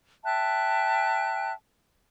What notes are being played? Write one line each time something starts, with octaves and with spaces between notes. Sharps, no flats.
E5 G5 A5 F#6